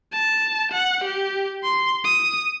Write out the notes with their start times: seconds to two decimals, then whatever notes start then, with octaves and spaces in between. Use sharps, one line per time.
0.12 A5
0.72 F#5
1.04 G4
1.64 C6
2.04 D#6